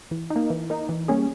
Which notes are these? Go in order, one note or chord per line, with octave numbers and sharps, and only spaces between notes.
E3
D#4
A#3
E3
A#3 D#4
E3
G3 A#3 C#4 G#4